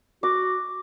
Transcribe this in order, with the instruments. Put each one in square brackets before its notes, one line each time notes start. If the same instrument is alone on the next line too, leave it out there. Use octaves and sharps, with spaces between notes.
[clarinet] F#4 [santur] D6